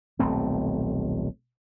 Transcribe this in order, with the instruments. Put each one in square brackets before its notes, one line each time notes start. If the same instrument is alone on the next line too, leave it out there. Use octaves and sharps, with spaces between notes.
[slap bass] D#1 B1 A3 C4